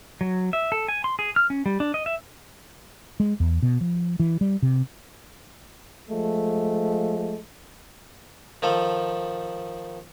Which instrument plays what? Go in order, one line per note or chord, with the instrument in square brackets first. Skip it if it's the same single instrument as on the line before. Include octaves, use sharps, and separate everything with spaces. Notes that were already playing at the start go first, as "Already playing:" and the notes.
[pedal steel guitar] F#3
E5
A4
G#5
C6
G#4
F6
C#4
G3
D4
D#5
E5
[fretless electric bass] G#3
E2
B2
F3
E3
G3
C3
[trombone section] F3 G#3 A3
[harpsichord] D#3 F3 A4